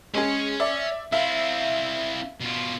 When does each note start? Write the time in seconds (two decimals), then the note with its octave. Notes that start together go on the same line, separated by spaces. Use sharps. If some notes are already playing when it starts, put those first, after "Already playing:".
0.14 G#3 C#4 G#4 C#5 G#5
0.60 D5 E5
1.12 C4 E4 E5 F5
2.40 B2 F4